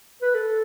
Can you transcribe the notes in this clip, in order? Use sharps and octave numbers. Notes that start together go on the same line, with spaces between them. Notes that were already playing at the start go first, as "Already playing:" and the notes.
B4
A4